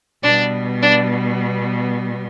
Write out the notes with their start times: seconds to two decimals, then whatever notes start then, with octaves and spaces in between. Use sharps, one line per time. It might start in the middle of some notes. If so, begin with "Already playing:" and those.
0.23 B2 G3 B3 D4 D5
0.81 D4 D5